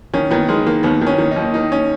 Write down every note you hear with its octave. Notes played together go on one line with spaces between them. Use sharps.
D#3 C#4
D#3 B3
D#3 G#3
D#3 A#3
D#2 B3
D#3
C#4
D#3
D#2 D#4
D#3 D#4
C#4